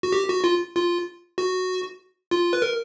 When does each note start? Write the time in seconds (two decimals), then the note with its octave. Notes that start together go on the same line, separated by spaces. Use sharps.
0.03 F#4
0.13 G4
0.29 F#4
0.44 F4
0.76 F4
1.38 F#4
2.31 F4
2.53 B4
2.62 A#4